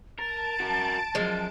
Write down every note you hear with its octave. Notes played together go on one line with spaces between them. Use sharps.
A#4 A5 A6 D7
F#4 A#4
C#2 F#2 F3 G#3